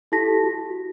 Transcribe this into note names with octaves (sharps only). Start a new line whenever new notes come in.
E4 G4 A4 A5 A#6 B6
F#4